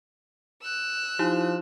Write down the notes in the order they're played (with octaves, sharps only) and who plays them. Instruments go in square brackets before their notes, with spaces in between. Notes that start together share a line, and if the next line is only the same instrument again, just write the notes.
[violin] E6 F#6
[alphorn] F3 [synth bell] D#4 E4 G4